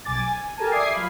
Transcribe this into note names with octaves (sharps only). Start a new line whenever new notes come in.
B1 G#5 D6 A6
G#5
G4 A4 A#4 G#5 A5
D5 E5 D6 D#6 G#6 C7
F#3 F4 F5 B5